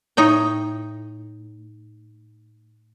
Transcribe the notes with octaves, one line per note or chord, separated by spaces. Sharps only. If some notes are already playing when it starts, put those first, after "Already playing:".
A2 D#4 C#5 G5